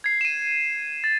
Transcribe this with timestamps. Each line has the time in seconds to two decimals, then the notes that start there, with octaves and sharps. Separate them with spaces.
0.04 G#6 C7
0.21 D#7 E7
1.04 A6